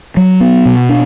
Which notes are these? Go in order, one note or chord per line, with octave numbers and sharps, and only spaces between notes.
F#3
B3
B2
D4